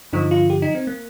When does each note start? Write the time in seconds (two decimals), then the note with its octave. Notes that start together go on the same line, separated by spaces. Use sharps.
0.13 G2 D3 F3 D#4
0.31 F4
0.50 G4
0.62 D#4
0.75 C4
0.87 A#3